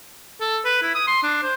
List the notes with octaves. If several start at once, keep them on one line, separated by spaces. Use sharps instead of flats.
A4
B4
E4
D#6
C6
D4
C5